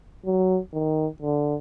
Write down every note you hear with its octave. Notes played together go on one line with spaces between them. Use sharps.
F#3
D#3
D3